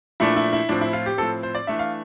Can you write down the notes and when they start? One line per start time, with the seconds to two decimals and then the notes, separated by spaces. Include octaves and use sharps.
0.20 A#2 F3 A3 D4 E4
0.36 E4
0.53 E4
0.69 A2 F3 C4 D4
0.81 E4
0.93 F4
1.06 G4
1.18 A2 F3 C4 A4
1.43 C5
1.55 D5
1.67 E3 A3 D4 E5
1.79 F5